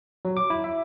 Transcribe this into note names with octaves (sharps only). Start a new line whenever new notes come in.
F#3
D6
E4
E5